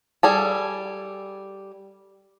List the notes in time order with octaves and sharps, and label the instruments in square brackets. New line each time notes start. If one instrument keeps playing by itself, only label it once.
[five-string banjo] G3 G#4 A4